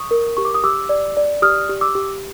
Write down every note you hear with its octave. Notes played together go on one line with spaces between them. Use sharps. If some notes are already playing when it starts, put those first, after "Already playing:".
Already playing: C#6 D#6
A#4
G4 C#6
D6
D#6
G4 D6 E6
D5
D5
G4 D#6 F6
G4
D6 E6
G4